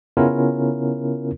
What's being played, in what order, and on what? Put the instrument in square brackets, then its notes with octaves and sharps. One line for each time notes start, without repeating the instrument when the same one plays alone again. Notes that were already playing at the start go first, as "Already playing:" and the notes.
[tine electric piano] C#3 B3 C#4 E4 F4 A#4